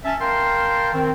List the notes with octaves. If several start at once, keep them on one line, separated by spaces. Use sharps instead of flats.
C#4 E5 A5
A#4 F5 G5 A5 A#5 C6
D#3 C4